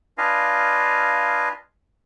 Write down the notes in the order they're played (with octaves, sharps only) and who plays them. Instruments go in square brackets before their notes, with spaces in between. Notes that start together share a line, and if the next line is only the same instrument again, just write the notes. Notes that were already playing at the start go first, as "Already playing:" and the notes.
[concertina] D4 F4 B4 D#5 F5 G#5